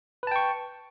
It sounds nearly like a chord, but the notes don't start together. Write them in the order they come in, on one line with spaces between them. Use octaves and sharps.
B4 A5 G5 C#6